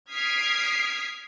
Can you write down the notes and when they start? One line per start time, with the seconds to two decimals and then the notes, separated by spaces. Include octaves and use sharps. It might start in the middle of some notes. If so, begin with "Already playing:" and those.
0.10 D#6 F6 G#6 B6 C7 D7